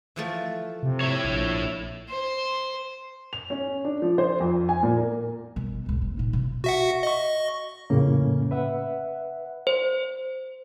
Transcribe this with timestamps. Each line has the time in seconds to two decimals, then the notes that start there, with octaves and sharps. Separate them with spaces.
0.16 E3 F3 A3
0.83 C3
1.01 E4 C#5
1.25 A#1
2.09 C5
3.33 F7
3.50 C#4
3.85 D4
4.02 F3
4.18 C5
4.40 F2
4.69 G#5
4.83 A#2
4.96 A#4
5.56 G1 B2
5.86 C#2 A2
6.02 E1
6.17 A#2 D#4
6.33 B2
6.64 F#4 E5 F#5
7.03 D#5 C#6
7.90 F2 A2 C#3 A#3 C#4
8.51 B4 E5 F#5
9.67 C5